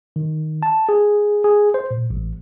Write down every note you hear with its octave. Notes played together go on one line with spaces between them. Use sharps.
D#3
A5
G#4
G#4
C5
A#2
A1